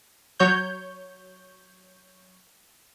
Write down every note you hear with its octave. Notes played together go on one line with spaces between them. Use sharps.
F#3 C#5 G6